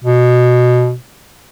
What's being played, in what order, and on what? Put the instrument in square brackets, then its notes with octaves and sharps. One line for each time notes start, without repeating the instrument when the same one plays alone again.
[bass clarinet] B2